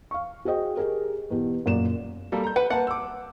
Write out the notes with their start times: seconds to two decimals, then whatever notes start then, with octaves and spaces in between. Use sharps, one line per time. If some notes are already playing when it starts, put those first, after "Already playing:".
0.11 F5 C#6
0.45 F#4 G#4 C5 D#5 G5
0.77 G4 G#4 A#4
1.30 E2 B2 G4
1.66 F#2 A#2 A#3 D5 E7
2.32 G3 A#3 A4
2.44 A#5 G6
2.56 B4 F#5
2.70 A#3 F#5 A5
2.87 D6 E6